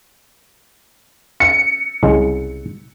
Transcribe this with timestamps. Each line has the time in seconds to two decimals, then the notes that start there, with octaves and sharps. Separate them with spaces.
1.40 C#7
2.03 C2 C#3 G#3